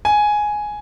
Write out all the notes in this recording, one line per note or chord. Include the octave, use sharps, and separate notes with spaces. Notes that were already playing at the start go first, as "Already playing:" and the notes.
G#5